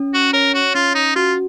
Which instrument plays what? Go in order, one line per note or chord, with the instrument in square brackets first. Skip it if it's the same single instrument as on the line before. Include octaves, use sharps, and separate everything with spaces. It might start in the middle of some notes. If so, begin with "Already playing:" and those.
Already playing: [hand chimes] C#4
[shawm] F#4
[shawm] A#4 [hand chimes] C#5
[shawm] F#4
[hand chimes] C#4 [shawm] F4
[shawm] D#4
[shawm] F4 [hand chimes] F#4